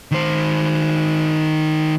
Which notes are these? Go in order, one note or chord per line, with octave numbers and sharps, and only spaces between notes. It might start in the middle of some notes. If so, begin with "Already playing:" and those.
D#3 C5